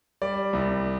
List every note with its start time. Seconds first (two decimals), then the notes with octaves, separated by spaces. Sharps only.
0.22 G3 D5
0.53 C2